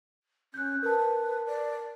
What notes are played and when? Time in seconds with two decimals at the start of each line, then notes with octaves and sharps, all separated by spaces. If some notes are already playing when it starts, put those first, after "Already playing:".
0.54 C#4 F#6 G6
0.83 A#4 B4 A5
0.99 B4
1.47 D5